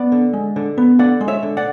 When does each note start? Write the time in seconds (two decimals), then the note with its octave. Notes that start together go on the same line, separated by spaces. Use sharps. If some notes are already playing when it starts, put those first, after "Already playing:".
Already playing: B3 D5 F#5
0.12 D3
0.33 G#3
0.56 D3
0.78 B3
0.99 D3 D5 F#5
1.21 G#3
1.28 C#5 E5
1.43 D3
1.57 D5 F#5